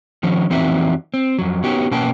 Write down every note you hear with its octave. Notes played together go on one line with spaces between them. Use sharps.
D#3 F3 C#4
F2 E3 C4 D#4 F#4 E5
C4
F2 F#3
B3 C#4 D#4 F#4 G4
B2 A#3 C#4 B4 G5 A5